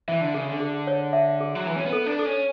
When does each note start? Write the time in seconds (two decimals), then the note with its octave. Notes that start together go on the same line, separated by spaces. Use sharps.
0.08 E3 E5
0.21 D3
0.34 C#3 G#4
0.48 D3
0.60 G#4
0.87 C#5
1.13 E5
1.40 G#4
1.55 F#3
1.66 E3 B5
1.76 C#4
1.86 B3
1.92 A4
2.06 D4
2.19 A4
2.25 C#4